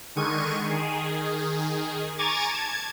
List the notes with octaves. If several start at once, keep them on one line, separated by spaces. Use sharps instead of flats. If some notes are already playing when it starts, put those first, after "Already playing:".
D3 D#3 G#3 C#6 D#7
D#3 G#4
G#5 A#5 C#6 D6 G#6 A6
A5 G#6